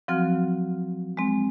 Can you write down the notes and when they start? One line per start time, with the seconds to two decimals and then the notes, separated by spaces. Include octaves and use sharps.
0.08 F3 F#3 C4 F#4 F6
1.17 G#3 C4